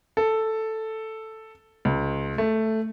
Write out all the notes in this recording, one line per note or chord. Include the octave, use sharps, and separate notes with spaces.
A4
C#2
A3